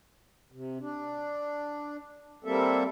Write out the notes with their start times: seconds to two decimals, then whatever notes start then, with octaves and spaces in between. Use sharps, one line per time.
0.52 C3
0.80 D4
2.44 G3 A#3 C4 A4 E5